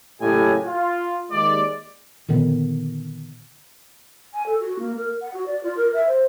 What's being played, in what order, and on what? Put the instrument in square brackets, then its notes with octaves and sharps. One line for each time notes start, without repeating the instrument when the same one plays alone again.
[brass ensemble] F#1 A2 C#3 G4 D#5 G#5
F4
D#2 G#3 D5
[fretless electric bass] A#2 D3 D#3 B3
[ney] G#5
A4
F#4
A#3
A#4
F#5
F#4
D5
F4
A#4
E5
C5